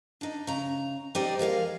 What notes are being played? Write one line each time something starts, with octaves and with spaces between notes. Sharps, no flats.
D4 D#4
C#3 A#5
G3 D#4 G4 C5 D5 D#5
F3 G#3 A#4 F5